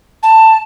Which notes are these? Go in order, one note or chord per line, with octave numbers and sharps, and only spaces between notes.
A5